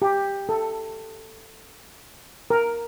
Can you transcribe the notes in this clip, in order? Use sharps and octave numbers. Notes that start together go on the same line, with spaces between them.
G4
A4
A#4